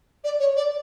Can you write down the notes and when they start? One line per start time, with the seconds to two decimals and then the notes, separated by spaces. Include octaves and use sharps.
0.24 D5
0.40 C#5
0.56 D5